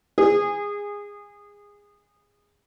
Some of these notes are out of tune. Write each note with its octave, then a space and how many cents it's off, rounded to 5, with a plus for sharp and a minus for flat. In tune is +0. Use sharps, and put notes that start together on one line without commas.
G#4 -20